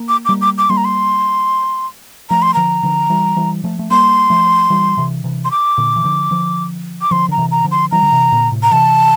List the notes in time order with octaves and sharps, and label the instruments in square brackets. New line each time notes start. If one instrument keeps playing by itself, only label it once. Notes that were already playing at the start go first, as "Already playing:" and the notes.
Already playing: [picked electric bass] A#3
[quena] D6
D6
[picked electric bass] G3 A#3
[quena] D6
D6
[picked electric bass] G3 A#3 [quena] C6
[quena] A#5
C6
[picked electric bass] F3 A3 [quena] A#5
[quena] C6
[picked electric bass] D3 F3 [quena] A#5
[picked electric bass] D3 F3
E3 G3
E3 G3
F3 A3
A3
[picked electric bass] G3 A#3 [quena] C6
[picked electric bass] F3 A3
E3 G3
C3 E3
C3 E3
[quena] C6
D6
[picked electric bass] A#2 D3
E3
D3 F3
D3 F3
[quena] D6
[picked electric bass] D3 F3 [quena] C6
[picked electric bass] D3 [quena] A#5
[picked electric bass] C3 E3
[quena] A#5
[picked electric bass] D3 F3
[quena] C6
[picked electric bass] E3 G3 [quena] A#5
[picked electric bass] D3
C3 E3
A#2 D3
A2 C3
[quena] A#5
[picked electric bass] C3 E3 [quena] A5